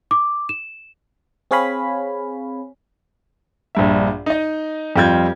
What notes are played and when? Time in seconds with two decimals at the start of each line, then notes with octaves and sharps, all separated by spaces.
0.11 D6
0.49 E7
1.51 C4 G#4 C#5 F5 G#5 B5
3.75 A#1 G2 E5
4.26 D#4 D#5
4.96 F2 G3 F4 G6 G#6